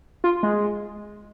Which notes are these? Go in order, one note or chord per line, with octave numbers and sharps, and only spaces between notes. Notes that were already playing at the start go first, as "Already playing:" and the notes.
F4
G#3